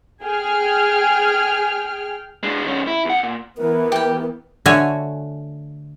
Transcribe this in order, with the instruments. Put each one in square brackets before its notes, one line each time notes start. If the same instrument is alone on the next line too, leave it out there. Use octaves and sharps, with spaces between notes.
[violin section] G#4 G5 F6
[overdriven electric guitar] G#3 D4
D#3 C#4
E4
E2 F#5
A#2
[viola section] E3 B3 [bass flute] A#4
[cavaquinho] G4 G5
[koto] D3 A3 F#4 C#5 G#5